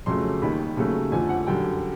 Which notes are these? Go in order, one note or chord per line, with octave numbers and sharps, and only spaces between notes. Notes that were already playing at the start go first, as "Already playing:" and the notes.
F2 C#3 F#3 A3 C6
D#2 D#3 G3 B5
D#2 C#3 F#3 A3
F2 D3 F3 A3 G#5
F#5
F#2 D3 G3 G5